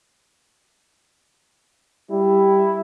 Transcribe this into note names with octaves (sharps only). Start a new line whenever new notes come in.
G3 E4